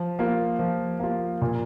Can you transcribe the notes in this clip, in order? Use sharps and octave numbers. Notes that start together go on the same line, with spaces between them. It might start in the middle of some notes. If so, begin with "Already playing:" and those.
Already playing: F3
A#3 F4
F3
A#3 F4
A#2